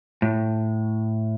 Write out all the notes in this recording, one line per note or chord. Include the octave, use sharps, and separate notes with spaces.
A2